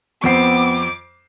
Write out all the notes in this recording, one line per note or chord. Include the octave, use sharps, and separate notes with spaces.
F2 B3 C4 D6 C7